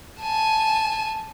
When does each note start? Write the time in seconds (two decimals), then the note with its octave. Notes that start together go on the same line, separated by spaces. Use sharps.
0.20 G#5 A5